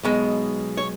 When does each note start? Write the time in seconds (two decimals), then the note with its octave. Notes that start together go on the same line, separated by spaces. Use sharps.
0.03 B1 B2 G#3
0.77 C#5